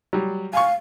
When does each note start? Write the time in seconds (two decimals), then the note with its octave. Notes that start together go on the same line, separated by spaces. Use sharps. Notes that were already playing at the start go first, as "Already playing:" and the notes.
0.13 F#3 G3
0.53 F5 G#5 C#6